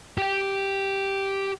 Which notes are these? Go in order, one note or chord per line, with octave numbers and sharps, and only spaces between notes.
G4 G5